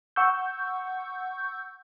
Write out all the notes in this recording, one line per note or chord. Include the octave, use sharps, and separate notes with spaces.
F#5 C#6 E6 G6